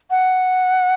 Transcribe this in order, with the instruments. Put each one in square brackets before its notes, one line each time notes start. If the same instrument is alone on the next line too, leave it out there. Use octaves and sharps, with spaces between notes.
[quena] F#5